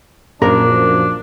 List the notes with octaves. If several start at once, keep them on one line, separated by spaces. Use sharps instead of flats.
A#1 F#2 F3 A#3 D4 A#4